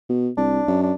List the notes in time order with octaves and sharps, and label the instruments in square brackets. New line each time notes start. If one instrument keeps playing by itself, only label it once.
[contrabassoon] B2
[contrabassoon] C2 [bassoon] D4
[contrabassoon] F#2
[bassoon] D4